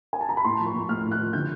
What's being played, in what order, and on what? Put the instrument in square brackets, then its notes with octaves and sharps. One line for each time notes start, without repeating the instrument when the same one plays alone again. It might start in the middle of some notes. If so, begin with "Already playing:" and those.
[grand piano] G#5
A5
A#5
B5
A2 C6
F3
C#6
A2
A3 F6
A2
F#6
F3
D3 G6